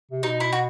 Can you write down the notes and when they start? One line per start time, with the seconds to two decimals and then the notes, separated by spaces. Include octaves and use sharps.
0.11 C3
0.23 B2 D#4
0.40 E4
0.53 F#4